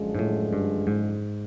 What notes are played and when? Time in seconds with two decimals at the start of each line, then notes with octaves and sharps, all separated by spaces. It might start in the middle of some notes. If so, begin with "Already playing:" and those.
Already playing: F#2 D3 F3 G#3
0.15 G#2
0.19 A2
0.53 G2
0.87 G#2